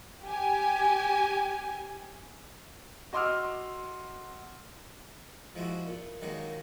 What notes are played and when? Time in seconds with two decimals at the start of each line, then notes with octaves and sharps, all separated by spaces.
0.24 G4 G#5
3.13 F#4 D#5 C6 D6 E6 F6
5.55 F3 G#3 E4 F#4
5.87 A#2
6.22 D#3 F#3 G#3 A#3